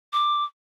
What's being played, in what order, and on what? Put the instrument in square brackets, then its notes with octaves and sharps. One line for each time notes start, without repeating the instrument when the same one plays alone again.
[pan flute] D6